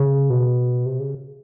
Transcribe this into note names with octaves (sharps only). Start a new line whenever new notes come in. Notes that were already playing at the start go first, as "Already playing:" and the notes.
Already playing: C#3
B2
C3
C#3